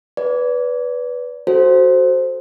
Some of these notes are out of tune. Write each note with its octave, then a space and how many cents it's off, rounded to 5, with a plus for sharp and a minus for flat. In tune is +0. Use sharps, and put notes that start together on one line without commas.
B4 +0 D5 -30
F#4 +10 A4 -5 C5 +0